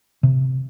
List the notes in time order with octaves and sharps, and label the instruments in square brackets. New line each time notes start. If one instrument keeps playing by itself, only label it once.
[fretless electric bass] C3